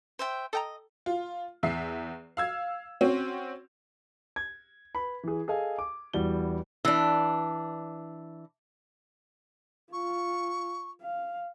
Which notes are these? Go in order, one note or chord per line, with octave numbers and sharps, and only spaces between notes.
C5 E5 G5
A4 D#5 G5 A#5
F4
E2 E5 C7
F5 E6 G#6
C4 C#4 F#4
G#6
B4 B5
E3 G#4
G#4 A4 D#5 F5 G#5
D6
E2 G3 E4 F#4 G7
E3 D4
F4 C#6
F5